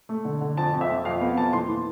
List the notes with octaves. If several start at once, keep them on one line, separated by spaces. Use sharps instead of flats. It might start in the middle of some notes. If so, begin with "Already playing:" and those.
A3
D3
D3
F2 A5
F2
E5
F2
F2 F5
B3 F5
F2 A5
E3 C6
E3